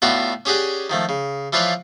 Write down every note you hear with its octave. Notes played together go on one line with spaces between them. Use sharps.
A2 B3 F4 F#4 D5 G5
C#4 G4 G#4 D5 F#5
D#3 F3 A3
C#3
E3 F3 F4 B4 C#5 D5